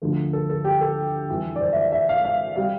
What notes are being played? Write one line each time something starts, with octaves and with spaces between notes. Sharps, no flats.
D2 D3 F3 A3
A4
A4
G4
A4
F2 E3 G3
D5
C5
E5
D5
E5
F5
F5
C3 G3 F5